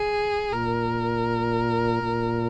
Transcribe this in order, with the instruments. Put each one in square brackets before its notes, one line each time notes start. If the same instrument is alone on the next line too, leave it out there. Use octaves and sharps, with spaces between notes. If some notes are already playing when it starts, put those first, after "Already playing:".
Already playing: [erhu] G#4
[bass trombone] A#2 [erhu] A#4
[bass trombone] A#2